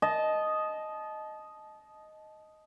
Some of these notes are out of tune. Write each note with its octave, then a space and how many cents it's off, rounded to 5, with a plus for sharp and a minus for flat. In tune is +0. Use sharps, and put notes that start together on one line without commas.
D#5 +0 A5 -25